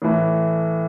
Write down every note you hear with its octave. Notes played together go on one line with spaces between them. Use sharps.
A2 E3 A3